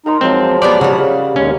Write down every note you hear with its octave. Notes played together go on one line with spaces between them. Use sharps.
D#4 A#4 A#5 C6
F3 F#3 G#3 C4
B3 D4 G4 D5
C#3 G3 A#3 F#5
D#2 G#3 C#4